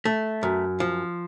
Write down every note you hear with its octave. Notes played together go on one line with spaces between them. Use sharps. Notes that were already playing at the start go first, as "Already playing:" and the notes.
A3
F#2
F3